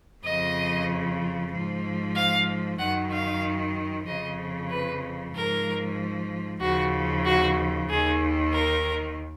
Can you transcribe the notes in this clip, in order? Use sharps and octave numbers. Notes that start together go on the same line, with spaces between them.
F2 C#3 F3 D#5
G#2 F3
F5
F#2 D#3 F#5
F5
F2 C#3 F3 D#5
B4
G#2 F3 A#4
D#2 C#3 F3 F#4
F#4
D#2 D#3 G#4
A#4